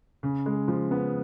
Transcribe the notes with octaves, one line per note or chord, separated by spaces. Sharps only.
C#3
G#3
F3
B3